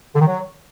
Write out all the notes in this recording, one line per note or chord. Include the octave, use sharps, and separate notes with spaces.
D3
D#3
F#3